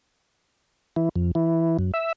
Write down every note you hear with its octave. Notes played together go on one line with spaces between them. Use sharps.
E3
F2
E3
F#2
E5